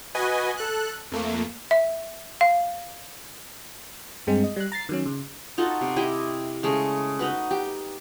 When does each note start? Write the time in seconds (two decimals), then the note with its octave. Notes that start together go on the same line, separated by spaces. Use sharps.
0.15 F#4 B4 D#5 G#5
0.57 A4 F#6
1.12 F2 A3 A#3
1.71 E5
2.41 F5
4.27 G2 G#3 C4
4.44 D#5
4.56 G3 F#6
4.72 A#5 A6 C7
4.89 D#3 F#3 C#4
5.06 C#3
5.58 D#4 F4 F#4 A4
5.81 C3
5.96 E4 G4 D#5
6.63 C#3 G#3 A3
7.19 D#4 F#4 B4
7.51 G4